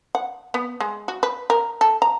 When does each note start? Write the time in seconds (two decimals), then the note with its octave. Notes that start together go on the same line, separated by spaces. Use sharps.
0.15 F#5
0.54 B3
0.80 G#3
1.08 F#4
1.23 B4
1.50 A#4
1.81 A4
2.02 A#5